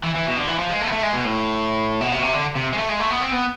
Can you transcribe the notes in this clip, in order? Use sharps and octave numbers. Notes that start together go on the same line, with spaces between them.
E3
E3
B2
D3
E3
F3
G#3
A3
B3
A3
G#3
B2
A2
B2
C3
B2
C3
D3
C3
G#3
A3
G#3
A3
B3
C4
B3